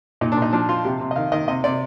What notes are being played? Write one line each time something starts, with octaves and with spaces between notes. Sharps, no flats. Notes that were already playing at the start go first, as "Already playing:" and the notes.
A#2 D#4
D4
A#2
D#4
F3 D4
F3 F4
C3 G4
C3
D#5
D#3 F5
D#3 D#5
C3 D#5
C3 D5